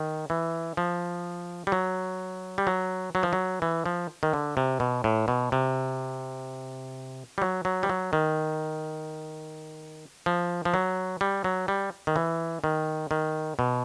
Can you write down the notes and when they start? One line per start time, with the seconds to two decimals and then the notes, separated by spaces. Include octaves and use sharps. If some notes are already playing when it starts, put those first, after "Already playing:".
Already playing: D#3
0.30 E3
0.77 F3
1.67 G3
1.72 F#3
2.58 G3
2.67 F#3
3.15 F#3
3.23 F3
3.33 F#3
3.62 E3
3.86 F3
4.23 D#3
4.33 D3
4.57 C3
4.80 B2
5.04 A2
5.28 B2
5.52 C3
7.38 G3
7.42 F#3
7.65 F#3
7.83 G3
7.89 F#3
8.13 D#3
10.26 F3
10.65 F3
10.74 F#3
11.21 G3
11.44 F#3
11.68 G3
12.07 D#3
12.16 E3
12.64 D#3
13.11 D#3
13.59 B2